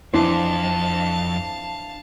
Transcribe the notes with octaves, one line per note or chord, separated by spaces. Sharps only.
F2 E3 D4 C5 F5 A5